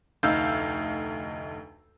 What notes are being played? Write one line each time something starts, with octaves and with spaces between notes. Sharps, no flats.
F1 D2 D#4 F5 E6 G6